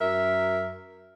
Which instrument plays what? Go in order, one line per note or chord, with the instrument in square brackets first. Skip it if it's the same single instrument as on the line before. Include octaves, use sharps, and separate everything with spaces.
[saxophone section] F#2 A#4 E5